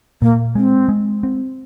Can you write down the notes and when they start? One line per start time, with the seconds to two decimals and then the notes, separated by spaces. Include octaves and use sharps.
0.22 A#2 A#3
0.55 G#3 C4
0.89 G#3
1.23 C4